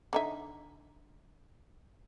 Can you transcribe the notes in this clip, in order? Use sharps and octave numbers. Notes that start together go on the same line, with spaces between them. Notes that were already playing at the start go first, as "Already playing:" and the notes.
D3 D#4 E5